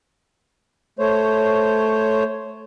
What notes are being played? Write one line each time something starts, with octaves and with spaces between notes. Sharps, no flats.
A3 C5 C#5